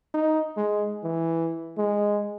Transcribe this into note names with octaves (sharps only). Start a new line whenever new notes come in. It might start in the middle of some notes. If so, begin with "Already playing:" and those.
D#4
G#3
E3
G#3